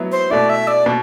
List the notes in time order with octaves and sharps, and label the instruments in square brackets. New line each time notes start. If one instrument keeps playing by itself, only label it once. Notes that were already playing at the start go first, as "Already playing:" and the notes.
Already playing: [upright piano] F#3 B3 E4
[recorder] C5
[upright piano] B2 A3 E4 [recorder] D5
[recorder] E5
D5
[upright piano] B2